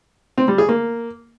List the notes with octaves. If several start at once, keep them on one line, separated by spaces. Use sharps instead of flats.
C4
G3
G#4
A#3